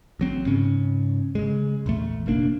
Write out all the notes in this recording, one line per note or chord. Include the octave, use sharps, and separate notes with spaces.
A1 F#3 C4
G#2 C#3 C#4
C#3 G#3
A#1 E2 A3
F#1 B2 A#3 D4